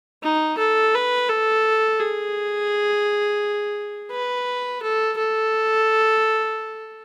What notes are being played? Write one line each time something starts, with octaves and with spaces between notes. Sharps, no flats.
D#4
A4
B4
A4
G#4
B4
A4
A4